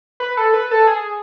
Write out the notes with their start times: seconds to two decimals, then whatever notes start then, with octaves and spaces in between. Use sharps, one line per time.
0.20 B4
0.37 A4
0.54 B4
0.71 A4
0.87 G#4